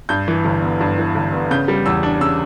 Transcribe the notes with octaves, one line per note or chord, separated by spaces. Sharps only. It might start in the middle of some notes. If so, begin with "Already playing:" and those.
G2 G6
E3
G1
B3
G2
E3
G1
B3
C#3 G6
G3
E2 E6
D4
C#3 E6